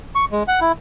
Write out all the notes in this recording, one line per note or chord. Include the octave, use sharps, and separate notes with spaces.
C#6
G#3
F#5
E4